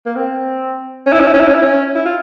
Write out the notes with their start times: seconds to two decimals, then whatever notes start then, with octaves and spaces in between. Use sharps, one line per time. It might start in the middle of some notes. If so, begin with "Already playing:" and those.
0.06 A#3
0.16 C4
1.06 C#4
1.12 E4
1.20 C#4
1.28 E4
1.34 C#4
1.41 E4
1.48 C#4
1.55 E4
1.62 C#4
1.96 E4
2.06 F4